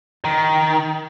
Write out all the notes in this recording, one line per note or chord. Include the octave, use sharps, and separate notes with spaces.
D#3